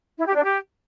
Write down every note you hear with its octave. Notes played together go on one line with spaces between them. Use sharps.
E4
G4
D4
G4